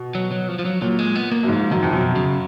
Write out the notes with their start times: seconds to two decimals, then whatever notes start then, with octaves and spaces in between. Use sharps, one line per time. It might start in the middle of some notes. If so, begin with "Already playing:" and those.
Already playing: B2
0.15 F#3
0.32 F#3
0.48 F3
0.59 F3
0.65 F#3
0.82 A#2 F#3
0.99 G#3
1.15 B3
1.32 A#3
1.43 F#2
1.48 G#2 F3
1.71 F#2 D#3
1.83 F2
1.93 F#2 B2
2.16 C#3